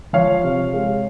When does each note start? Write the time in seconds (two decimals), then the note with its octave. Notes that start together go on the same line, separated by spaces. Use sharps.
0.13 F3 C#5 F5
0.44 C3
0.74 G#3